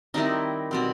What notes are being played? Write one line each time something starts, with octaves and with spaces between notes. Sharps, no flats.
D#3 G3 C4 D#4 E4 D#5
B2 G3 C4